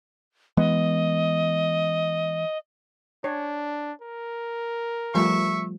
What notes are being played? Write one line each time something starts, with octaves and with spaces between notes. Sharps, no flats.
E3 G#3 B3 D#5
D4 C#5
A#4
F3 G3 A3 E5 C#6